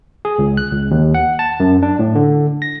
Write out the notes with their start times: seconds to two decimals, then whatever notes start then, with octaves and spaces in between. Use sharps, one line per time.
0.25 G#4
0.39 C#2
0.57 F#6
0.72 C#2
0.91 D#2
1.14 F#5
1.39 A5
1.60 F#2
1.83 D4
1.99 A2
2.15 D3
2.62 A#6